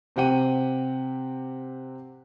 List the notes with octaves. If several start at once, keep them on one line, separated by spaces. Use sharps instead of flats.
C3 C4 G4 F#5 G5 D#7